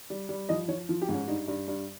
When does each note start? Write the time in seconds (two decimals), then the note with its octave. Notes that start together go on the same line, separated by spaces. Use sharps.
0.10 G3
0.29 G3
0.49 F3 D#5
0.68 F3 C#5
0.89 F3 F4
1.02 G4
1.09 G#2
1.14 C#4
1.27 G2 D#4
1.48 G2
1.68 G2